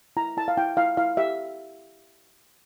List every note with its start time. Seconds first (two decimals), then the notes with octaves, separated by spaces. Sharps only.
0.17 E4 A#5
0.37 E4 A5
0.48 F5
0.57 E4 G5
0.77 E4 F5
0.97 E4 F5
1.17 G4 E5